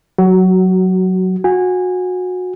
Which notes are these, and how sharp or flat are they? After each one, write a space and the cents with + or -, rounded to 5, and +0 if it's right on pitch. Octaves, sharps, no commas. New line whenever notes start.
F#3 +0 F#4 +20
F#4 -25 G#5 -20